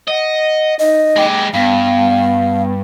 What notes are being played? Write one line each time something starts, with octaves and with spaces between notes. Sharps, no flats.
D#5 F#5
D#4 D#5
G#3 G4
G2 B3 F5